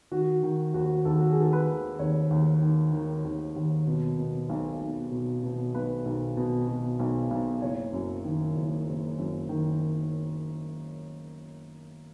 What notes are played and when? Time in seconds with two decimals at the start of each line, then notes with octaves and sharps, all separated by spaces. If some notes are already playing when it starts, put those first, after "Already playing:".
0.12 D#3 F#4
0.43 D#3
0.74 D#2 F#4
1.05 D#2 A4
1.20 F#4
1.31 G#4
1.37 D#3 A4
1.53 B4
1.68 D#3
1.99 D#2 C#5
2.30 D#2
2.62 D#3
2.93 D#3
3.24 D#2
3.56 D#2
3.87 B2
4.18 B2
4.49 B1
4.81 B1
5.11 B2
5.43 B2
5.74 B1 B4
6.05 B1
6.37 B2
6.68 B2
6.99 B1
7.31 B1
7.62 F#1 C#5
7.93 F#2
8.24 D#3
8.56 F#1
8.87 F#1
9.18 F#2
9.49 D#3